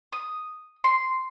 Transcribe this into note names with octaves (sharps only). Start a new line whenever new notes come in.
D#6
C6